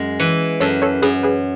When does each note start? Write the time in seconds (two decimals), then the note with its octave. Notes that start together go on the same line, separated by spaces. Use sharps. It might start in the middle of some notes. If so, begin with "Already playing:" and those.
Already playing: F#2 G#3
0.20 E3
0.60 F#2 A4 C#5
0.82 A4 C#5
1.02 F#2 G#4 B4
1.23 G#4 B4